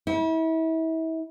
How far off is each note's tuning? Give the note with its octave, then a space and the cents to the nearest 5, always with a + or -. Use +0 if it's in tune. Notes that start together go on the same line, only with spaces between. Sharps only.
E4 -35